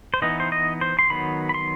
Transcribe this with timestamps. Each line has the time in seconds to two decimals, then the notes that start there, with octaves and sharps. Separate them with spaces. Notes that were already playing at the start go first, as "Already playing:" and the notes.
0.14 C5
0.22 E3 B3 D#4 D#5
0.40 C5
0.52 D#5
0.81 C5
0.99 C6
1.10 D#3 F#3 B3 B5
1.49 B5
1.54 C6